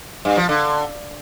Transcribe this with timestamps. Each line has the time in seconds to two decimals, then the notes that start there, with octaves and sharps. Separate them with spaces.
0.25 G2
0.37 F3
0.49 D3